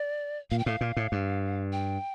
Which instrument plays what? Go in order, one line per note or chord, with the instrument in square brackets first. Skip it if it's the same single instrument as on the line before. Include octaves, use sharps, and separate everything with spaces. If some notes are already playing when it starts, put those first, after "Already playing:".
Already playing: [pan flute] D5
[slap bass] A#2 [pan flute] F5
[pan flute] G5
[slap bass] A2 [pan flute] F5
[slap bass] A#2
A2
G2
[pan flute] G5